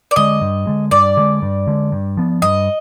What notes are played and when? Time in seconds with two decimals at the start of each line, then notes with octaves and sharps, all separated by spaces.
0.11 D5
0.16 D3 G#3 D#5
0.41 G2
0.67 D3 G#3
0.91 G2 D5
1.17 D3 G#3
1.42 G2
1.67 D3 G#3
1.92 G2
2.17 F3 B3
2.42 G2 D#5